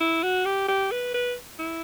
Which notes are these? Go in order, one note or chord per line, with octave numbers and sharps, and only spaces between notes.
E4
F#4
G4
G4
B4
B4
E4